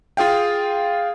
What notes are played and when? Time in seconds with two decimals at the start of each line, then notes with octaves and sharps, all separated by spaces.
0.17 F4 G#4 F5 G5